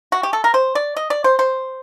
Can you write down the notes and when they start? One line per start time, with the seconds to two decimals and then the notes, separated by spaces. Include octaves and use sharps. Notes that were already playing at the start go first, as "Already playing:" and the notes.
0.12 F#4
0.23 G4
0.33 A4
0.44 A#4
0.54 C5
0.75 D5
0.96 D#5
1.10 D5
1.24 C5
1.39 C5